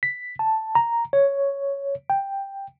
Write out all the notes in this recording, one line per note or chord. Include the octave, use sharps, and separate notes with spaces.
B6
A5
A#5
C#5
G5